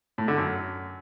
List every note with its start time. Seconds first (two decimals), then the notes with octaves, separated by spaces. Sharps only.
0.18 A2
0.28 D3
0.38 F#2